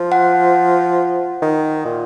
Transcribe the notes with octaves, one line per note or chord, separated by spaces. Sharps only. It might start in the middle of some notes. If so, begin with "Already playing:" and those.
Already playing: F3
F#5
D#3
A#2